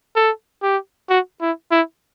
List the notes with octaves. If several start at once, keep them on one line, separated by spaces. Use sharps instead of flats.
A4
G4
F#4
E4
E4